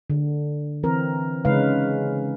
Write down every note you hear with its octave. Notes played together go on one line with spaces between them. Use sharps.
D3
E3 C4 A#4
C#3 G#3 C#4 D#4 B4 F5